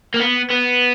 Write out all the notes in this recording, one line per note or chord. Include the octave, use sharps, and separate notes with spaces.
A#3
B3
B3